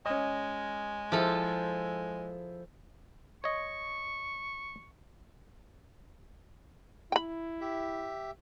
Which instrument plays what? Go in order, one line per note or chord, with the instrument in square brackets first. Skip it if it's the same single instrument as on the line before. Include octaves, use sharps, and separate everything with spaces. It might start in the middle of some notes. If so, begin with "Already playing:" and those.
[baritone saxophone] G#3 [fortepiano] C#4 D#5
[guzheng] F3 A4 [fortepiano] E4 G#4 C5
[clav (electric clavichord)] C#5 D#5 [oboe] C#6
[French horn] E4 [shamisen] G5 B5
[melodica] G4 E5